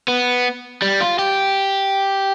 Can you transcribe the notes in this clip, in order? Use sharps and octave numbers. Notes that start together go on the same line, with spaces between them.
B3
G3
F4
G4